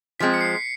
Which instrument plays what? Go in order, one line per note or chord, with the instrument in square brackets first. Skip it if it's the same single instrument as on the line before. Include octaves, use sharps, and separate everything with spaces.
[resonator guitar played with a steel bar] F3 G#3 C4 [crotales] B6
[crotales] C#7
C7